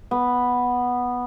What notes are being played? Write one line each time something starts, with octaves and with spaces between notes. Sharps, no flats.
B3